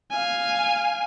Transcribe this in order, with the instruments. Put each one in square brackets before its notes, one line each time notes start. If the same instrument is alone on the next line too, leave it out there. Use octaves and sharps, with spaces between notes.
[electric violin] F5 G#5